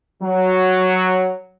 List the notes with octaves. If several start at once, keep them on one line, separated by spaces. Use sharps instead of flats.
F#3